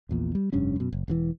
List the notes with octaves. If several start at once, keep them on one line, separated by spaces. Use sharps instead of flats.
A#1 E2 A#2
G3
F1 G2 C#4
F#2 B2
F#1
E1 C3 E3